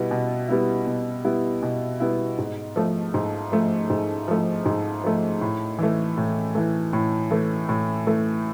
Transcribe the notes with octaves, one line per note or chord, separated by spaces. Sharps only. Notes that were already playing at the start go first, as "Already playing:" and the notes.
Already playing: B2 G3 B3 E4
B2
G3 B3 E4
B2
G3 B3 E4
B2
G3 B3 E4
G#2
F3 A3
G#2
F3 A3
G#2
F3 A3
G#2
F3 A3
A2
E3 A3
A2
E3 A3
A2
E3 A3
A2
E3 A3